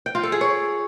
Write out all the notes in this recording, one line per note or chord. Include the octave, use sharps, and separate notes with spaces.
G5
F4
A4
G#4
C#5